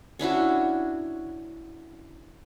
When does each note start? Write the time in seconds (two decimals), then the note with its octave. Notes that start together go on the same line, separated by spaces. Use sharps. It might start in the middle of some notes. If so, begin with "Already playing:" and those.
0.19 C#4 D4 E4 F#4